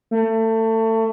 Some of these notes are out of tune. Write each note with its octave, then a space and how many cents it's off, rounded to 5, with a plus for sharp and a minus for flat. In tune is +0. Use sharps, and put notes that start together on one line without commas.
A3 +25